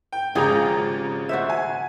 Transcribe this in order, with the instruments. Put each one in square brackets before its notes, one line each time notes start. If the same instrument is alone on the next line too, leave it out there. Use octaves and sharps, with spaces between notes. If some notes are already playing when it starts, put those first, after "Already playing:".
[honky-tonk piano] G5
[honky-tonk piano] G#1 C#3 A#5 [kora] F3 G4 G#4
[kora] F#4 C5 E5
[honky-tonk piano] G#5